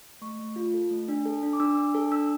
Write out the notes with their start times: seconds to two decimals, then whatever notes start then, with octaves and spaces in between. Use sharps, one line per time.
0.21 A3 C#6
0.39 A3
0.56 F4
0.74 A4
0.91 A3
1.08 D4
1.26 A4
1.43 D4
1.53 D6
1.60 D4 E6
1.77 D4
1.95 A4
2.11 D4 E6